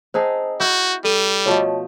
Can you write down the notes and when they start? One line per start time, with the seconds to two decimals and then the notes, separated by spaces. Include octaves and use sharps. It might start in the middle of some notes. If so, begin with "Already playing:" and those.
0.14 C4 D#4 G#4 C5 A5
0.60 E4 F#4 G6
1.04 G3 A4 D#7
1.46 B2 F3 A3 C#5 D#5